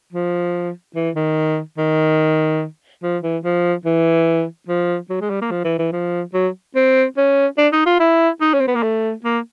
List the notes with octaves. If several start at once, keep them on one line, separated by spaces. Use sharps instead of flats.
F3
E3
D#3
D#3
F3
E3
F3
E3
F3
F#3
G#3
G3
A#3
F3
E3
E3
F3
F#3
C4
C#4
D4
D#4
F4
E4
D#4
C#4
C4
B3
A#3
A3
A#3